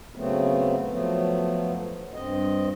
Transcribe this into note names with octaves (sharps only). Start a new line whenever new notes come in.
C#3 F#3 A3 B3 C4
F3 F#3 A3 B3
G2 C4 D#5